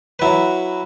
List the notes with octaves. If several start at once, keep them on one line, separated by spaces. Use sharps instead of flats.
F#3 E4 B4